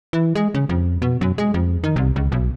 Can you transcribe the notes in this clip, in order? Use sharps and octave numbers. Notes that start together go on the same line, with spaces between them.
E3
G#3
C#3
F2
B2
F#2
G#3
F2
D#3
C2
C#2
B1